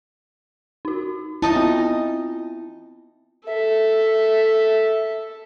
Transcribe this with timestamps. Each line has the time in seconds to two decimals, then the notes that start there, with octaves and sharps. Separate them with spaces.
0.85 D#4 F#4
1.42 D#4 E4 D#5 A5
1.56 B3 C4 F4
3.47 A4 E5